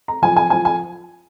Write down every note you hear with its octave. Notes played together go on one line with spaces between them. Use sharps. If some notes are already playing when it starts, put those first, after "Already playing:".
A#5
F3 G#5
G#5
F3 G#5
G#5